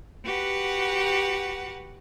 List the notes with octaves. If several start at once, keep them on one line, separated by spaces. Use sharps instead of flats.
F#4 G4 B4 F#5